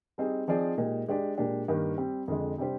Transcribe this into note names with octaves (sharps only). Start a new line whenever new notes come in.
G3 C4 D#4 G#4
F3 C4 D#4 G#4 D5
A#2 G#3 D#4 G4
G#3 D4 G4 D5
A#2 G#3 D4 G4
G2 D#3 A#3
G3 C4 G4
F2 D3 G#3
C3 G3 D4 G4 C5